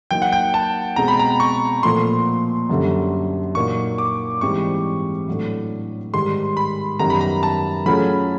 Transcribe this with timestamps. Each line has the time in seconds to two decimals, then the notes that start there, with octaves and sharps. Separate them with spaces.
0.11 F#3 A#3 D#4 G5
0.22 F#5
0.32 G5
0.54 A5
0.96 B2 G#3 C4 A#5
1.08 B5
1.19 A#5
1.40 C#6
1.83 A#2 F3 A3 C6
2.69 F#2 D3 G3
3.55 A#2 F#3 A#3 D#4 C#6
3.98 D6
4.41 G#2 E3 G3 C4 D#4 C#6
5.28 A2 F#3 A3 D4
6.13 G#2 D#3 G3 C6
6.57 B5
6.99 F#2 D#3 G3 B3 A#5
7.10 B5
7.21 A#5
7.43 A5
7.86 F#3 A3 C#4 F4 G#4 B5